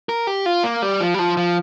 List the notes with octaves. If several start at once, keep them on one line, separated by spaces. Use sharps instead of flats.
A#4
G4
F4
A#3
G3
F3
G3
F3
F3